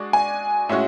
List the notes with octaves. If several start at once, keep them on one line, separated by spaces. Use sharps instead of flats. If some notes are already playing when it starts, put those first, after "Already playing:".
Already playing: G#3 D4 F#4
G#5
A2 G#3 C#4 F#4 E5